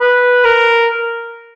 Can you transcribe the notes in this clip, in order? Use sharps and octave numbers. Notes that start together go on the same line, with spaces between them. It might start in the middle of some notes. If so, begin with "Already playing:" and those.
B4
A#4